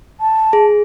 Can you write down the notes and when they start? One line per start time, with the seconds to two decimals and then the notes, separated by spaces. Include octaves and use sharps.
0.20 A5
0.53 G#4